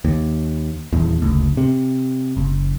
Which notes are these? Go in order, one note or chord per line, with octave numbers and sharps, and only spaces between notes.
D#2
D#1 E2
F#1 D2
C3
F#1